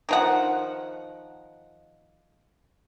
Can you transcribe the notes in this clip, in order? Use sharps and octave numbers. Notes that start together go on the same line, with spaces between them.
D#3 F3 F#5